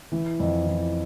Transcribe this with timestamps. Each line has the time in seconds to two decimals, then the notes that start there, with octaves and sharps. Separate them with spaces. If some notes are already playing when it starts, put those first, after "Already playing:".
0.12 E3
0.40 F2
0.66 E3